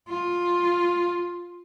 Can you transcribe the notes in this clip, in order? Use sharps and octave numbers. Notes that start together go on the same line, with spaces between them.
F4